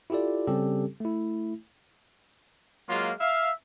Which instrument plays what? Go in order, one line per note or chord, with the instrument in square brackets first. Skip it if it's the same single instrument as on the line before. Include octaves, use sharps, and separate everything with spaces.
[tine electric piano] E4 F4 G4 A4 D5
C#3 G3 C4 C#4 G4 A4
A3 E4
[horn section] F#3 G#3 A#3 F4
E5 F5